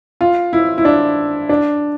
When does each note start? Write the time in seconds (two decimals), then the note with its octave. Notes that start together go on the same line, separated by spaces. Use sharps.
0.21 F4
0.53 E4
0.78 E4
0.85 D4
1.49 D4